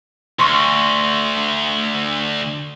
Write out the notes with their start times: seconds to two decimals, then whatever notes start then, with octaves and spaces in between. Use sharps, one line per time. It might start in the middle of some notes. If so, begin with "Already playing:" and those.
0.39 D2 C6 C#6